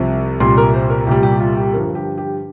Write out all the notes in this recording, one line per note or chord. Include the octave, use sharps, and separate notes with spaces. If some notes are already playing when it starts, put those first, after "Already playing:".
Already playing: C2 C3 F3
C2 A#2 G3 C6
A#4
C5
A#4
C2 A#2 G3 G4
G4
F4
G4
G2 D3 F3 A#4
G4
G4